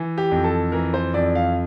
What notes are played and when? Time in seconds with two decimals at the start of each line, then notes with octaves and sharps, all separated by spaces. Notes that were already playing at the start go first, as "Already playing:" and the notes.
Already playing: E3
0.18 G4
0.31 F2
0.44 A4
0.72 E3 A#4
0.94 C5
1.14 F2 D5
1.35 F5